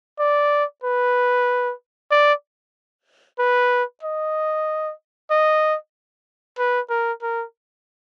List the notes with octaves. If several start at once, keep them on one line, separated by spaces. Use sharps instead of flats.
D5
B4
D5
B4
D#5
D#5
B4
A#4
A#4